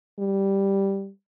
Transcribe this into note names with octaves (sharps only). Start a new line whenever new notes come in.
G3